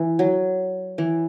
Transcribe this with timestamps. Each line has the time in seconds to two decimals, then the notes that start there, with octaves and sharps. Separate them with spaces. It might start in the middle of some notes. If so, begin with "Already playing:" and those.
Already playing: E3
0.19 F#3
0.98 E3